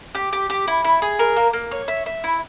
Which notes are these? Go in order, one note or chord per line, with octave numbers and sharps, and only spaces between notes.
G4
G4
G4
E4
E4
G#4
A#4
A#3
A#3
C#5
E5
E5
E4